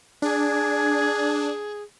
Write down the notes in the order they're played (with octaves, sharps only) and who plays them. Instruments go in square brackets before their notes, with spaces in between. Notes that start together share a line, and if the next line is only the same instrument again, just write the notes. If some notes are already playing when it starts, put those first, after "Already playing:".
[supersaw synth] D4 [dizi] G#4